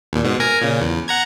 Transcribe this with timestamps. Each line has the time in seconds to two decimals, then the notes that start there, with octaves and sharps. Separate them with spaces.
0.13 D#2 A#2
0.25 G#2 B2
0.40 A#4 G#5 A#5
0.61 A#2 C#3
0.82 E2
1.08 F#5 A#5 G#6